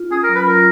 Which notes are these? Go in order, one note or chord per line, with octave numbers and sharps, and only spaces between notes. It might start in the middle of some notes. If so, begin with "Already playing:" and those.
Already playing: F4
C#4 G#4
A#4
F#3
B4
F4 A#4